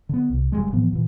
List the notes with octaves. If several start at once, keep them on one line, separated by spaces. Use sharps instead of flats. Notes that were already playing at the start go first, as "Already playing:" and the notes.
D3 B3
C2
F#1 D#2 G3 G#3
A2 E3 F3 B3
A#2 E3